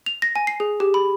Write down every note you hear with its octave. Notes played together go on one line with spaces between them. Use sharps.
F7
A#6
G#5
C7
G#4
G4
B5